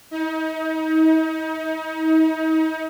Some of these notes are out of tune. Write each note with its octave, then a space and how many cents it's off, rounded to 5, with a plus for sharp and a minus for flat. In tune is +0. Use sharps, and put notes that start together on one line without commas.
D#4 +35